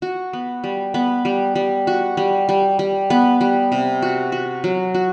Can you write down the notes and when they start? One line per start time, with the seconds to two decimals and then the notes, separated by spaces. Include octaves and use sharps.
0.02 F#4
0.33 B3
0.64 G3
0.94 B3
1.25 G3
1.55 G3
1.87 F#4
2.17 G3
2.49 G3
2.79 G3
3.10 B3
3.41 G3
3.72 C3
4.02 F#4
4.32 F#4
4.64 F#3
4.94 F#4